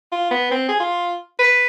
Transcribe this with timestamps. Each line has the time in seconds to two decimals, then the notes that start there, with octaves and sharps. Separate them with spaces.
0.12 F4
0.31 B3
0.51 C4
0.69 G#4
0.80 F4
1.39 B4